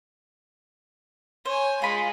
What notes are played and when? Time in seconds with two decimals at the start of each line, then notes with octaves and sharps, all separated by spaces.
1.45 C5 C#5 G#5
1.82 G#3 F4 B5